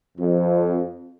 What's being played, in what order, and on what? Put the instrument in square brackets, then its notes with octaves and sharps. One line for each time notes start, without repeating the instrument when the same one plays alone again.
[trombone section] F2